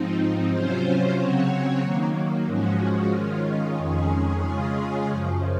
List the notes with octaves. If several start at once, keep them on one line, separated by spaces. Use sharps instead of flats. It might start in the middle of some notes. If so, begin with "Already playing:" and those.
Already playing: G#2 F3 C4 D#4
C3 F#3 C#4 F4 C5
C#3 F#3 C4 F#4 C#5
D#3 F#3 A#3
G#2 F3 G#3 C#4 F#4
D#3 G#3 C#4 F4
F2 D#3 G#3 C#4 G#4
C#3 G#3 C#4 F4 G#4
F#2 C#3 F3